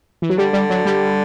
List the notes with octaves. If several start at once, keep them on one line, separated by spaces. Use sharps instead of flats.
E3
F#3
D3 G3
G3
F#3
G3